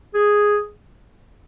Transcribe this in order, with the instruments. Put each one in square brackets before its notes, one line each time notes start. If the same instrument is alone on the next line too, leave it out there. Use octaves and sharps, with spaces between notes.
[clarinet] G#4